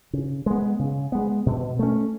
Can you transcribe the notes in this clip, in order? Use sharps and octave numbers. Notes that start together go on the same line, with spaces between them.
C#3
G#3 B3
C#3
G#3 B3
B2
A3 C#4